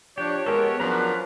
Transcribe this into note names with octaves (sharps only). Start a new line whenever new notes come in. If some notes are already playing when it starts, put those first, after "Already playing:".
F3 D4 G4 C#5
G#3 B3 G4 A4 A#4
F3 F#3 C#4 D4 A#4 B4 A#5